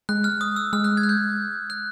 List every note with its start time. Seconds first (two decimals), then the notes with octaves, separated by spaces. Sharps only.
0.09 G#3 F#6
0.24 F6
0.41 D#6
0.56 E6
0.73 G#3 F6
0.84 F#6
0.97 G#6
1.03 F#6
1.09 G6
1.70 F#6